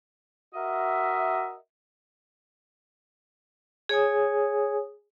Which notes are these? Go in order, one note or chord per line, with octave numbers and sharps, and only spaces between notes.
F#4 A#4 D#5 E5
G#4 C#5 G#5 D#6